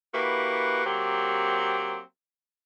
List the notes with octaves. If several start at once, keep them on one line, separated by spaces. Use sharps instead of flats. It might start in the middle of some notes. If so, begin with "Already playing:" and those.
A#3 E4 F#4 G4 B4
F#3 A#3 C4 G4